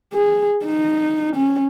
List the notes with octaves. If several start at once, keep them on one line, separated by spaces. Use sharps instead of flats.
G#4
D#4
C#4